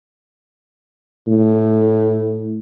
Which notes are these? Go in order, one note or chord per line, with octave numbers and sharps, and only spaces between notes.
A2